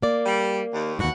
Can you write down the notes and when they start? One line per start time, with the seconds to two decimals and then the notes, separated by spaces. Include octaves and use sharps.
0.02 A#3 D5
0.25 G3
0.72 D#2
0.99 D#2 G#2 B2 F#4 F#5